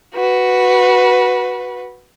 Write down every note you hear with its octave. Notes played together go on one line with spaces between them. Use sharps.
F#4 B4